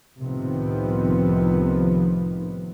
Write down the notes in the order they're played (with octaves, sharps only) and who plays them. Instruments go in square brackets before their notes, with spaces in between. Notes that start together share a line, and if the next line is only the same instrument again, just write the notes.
[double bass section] C2 A2 C3 D#3 F3 B3